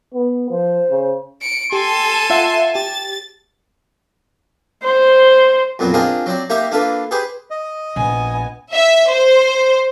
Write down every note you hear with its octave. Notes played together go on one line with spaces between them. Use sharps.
B3
F3 C5
C#3
C#7 D7
G4 A4 G#5 A5 C6
F4 E5 F#5
G4 A6
C5
F2 A#2 F#3 B3
C4 D4 F4 G#4 A#4 D#5
F#3 C4 D5
A#3 D#4 G4 E5 A#5
A#3 D4 F4 A4 B4
G4 G#4 B4 C5
D#5
A#1 B3 G#5
E5
C5